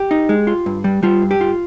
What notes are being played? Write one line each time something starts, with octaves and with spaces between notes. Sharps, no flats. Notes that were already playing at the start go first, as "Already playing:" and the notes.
Already playing: G4
D#4
G#3
F4
G2
G3
G3 F4
G2
G4
F4